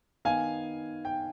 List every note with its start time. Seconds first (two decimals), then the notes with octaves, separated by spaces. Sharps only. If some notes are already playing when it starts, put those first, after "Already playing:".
0.25 D#3 B3 F5 G#5
1.05 G5